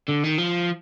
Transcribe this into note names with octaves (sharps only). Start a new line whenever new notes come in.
D3
D#3
F3